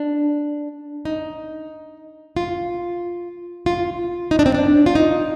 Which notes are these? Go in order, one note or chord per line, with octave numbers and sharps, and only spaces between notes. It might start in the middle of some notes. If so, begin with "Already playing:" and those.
Already playing: D4
D#4
F4
F4
D#4
D4
C4
D4
F4
D#4